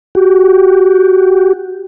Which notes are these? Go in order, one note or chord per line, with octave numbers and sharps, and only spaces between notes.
F#4 G4